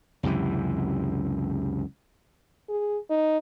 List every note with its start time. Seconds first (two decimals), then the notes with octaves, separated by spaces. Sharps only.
0.23 C#2 F#2 C3 E3
2.69 G#4
3.10 D#4